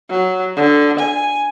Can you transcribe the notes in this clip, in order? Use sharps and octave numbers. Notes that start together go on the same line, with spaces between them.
F#3
D3
G#5